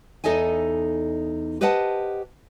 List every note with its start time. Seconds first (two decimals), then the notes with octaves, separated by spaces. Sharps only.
0.24 E2 D#4 A4 D#5 E5 G#5
1.61 G4 B4 C5 D#5 F#5 A5